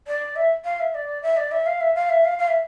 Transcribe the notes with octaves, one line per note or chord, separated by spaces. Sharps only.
D5
E5
F5
E5
D5
E5
D5
E5
F5
E5
F5
E5
F5
F5
E5